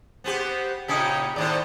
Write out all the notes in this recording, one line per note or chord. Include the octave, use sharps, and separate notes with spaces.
B3 C4 G4
A#2 C#3 C#4 D#4 E4 G4
D#2 A2 C4 D5